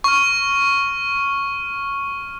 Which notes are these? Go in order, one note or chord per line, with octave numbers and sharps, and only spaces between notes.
C#6 F6